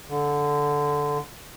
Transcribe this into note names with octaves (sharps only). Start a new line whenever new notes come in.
D3